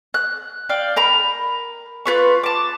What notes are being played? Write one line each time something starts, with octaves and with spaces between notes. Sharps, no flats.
F#6
D5 F5 G5
A#4 A#5 B5
F4 B4 C#6
A5 D6